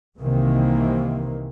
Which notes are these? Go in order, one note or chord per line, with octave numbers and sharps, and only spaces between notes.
C2 C3 D#3 E3 A#3